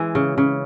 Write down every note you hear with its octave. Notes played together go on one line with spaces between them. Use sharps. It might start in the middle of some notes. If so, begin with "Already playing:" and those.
Already playing: E3 G#3
C#3
C#3